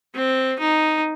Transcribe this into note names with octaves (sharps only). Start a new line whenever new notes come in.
C4
D#4